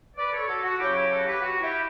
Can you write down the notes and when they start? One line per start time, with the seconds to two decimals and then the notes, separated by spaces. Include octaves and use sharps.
0.16 B4 D5
0.32 A4 C#5
0.47 F#4 A4
0.63 F#4
0.78 C#3 F#3 C#4 E4 G4
0.94 E4 G4
1.09 F#4 A4
1.25 G4 B4
1.40 F#4
1.61 E4 G4